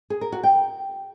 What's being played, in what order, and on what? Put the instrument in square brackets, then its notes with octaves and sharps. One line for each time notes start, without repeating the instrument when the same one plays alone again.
[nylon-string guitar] G#4
A#4
F#4
G5